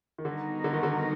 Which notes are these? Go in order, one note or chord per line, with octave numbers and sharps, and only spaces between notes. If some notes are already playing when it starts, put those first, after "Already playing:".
D#3
D3 G3 B3 D#4 F#4 A#4
D3
D#3
D3